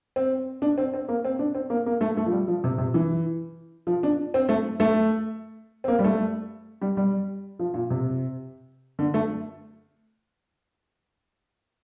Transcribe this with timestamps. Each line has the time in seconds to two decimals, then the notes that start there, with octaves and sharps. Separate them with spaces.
0.16 C4
0.62 D4
0.78 C4
0.94 C4
1.08 A#3
1.25 C4
1.39 D4
1.55 C4
1.70 A#3
1.86 A#3
2.01 A3
2.17 A3
2.26 F3
2.32 G3
2.48 F3
2.64 C3
2.78 C3
2.94 E3
3.87 F3
4.03 D4
4.34 C4
4.49 A3
4.80 A3
5.84 C4
5.88 A#3
5.99 G3
6.04 A3
6.82 G3
6.97 G3
7.59 F3
7.74 A#2
7.90 C3
8.99 D3
9.14 A3